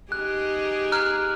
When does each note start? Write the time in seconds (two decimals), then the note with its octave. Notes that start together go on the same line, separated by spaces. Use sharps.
0.12 D#4 G4 G#4 F#6
0.92 A#5 F6 F#6